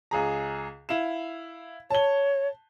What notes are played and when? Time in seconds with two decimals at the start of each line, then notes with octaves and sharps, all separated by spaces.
0.11 C#2 G#4 A#5
0.89 E4 F5 E7
1.91 C#5 A5 G7